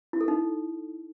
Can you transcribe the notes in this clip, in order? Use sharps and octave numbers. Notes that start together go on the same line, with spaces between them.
E4
A4
D#4